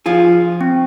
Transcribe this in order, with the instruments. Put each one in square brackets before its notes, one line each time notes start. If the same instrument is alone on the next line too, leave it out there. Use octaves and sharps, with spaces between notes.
[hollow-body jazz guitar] F3 F4 G#4
[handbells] C4